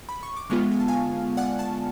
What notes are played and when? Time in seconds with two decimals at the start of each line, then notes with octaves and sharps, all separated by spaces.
0.09 B5
0.23 C#6
0.37 D6
0.50 D3 G#3 B3 F4 C#6 F6
0.72 G#5
0.80 A5
0.88 F5 G#5
1.37 D5 F#5
1.59 F#5 A5